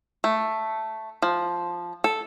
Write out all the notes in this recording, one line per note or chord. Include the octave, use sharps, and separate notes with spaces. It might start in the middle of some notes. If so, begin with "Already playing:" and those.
A3
F3
A4